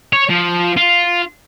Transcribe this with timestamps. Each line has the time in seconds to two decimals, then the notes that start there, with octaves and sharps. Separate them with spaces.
0.13 C#5
0.29 F3
0.77 F4